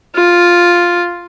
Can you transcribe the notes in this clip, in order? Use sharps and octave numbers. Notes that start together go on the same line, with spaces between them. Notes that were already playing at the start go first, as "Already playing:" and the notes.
F4